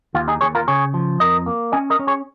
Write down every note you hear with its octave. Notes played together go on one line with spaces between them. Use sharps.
D#2 F4
D#4 G#4
D#2 G#4 C#5
F4 A#4
C#3 G#4 C#5
F3
F2 A#4 D#5
A#3
C#4 D#5 G#5
A#4 D#5
C#4
G#4 C#5